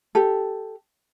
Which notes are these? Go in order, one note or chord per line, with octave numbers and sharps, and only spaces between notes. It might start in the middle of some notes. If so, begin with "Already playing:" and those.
G4 A4